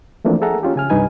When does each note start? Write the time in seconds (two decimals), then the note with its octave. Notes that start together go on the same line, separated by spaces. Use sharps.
0.25 E3 F3 A3 A#3 C4 D4
0.42 G#4 A4 E5 F#5 A#5
0.63 C#4 F4 G4
0.76 C#3 G#5 F6
0.90 C2 G2 D#4 B4 G#5